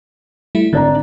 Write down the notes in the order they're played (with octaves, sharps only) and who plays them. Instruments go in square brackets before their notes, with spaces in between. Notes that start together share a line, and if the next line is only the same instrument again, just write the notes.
[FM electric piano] G3 A3 E4
[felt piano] G#1 D4 A#5 [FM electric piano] D3